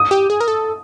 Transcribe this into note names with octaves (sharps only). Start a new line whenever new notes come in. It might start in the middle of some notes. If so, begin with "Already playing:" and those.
Already playing: D#6
G4
G#4
A#4
A4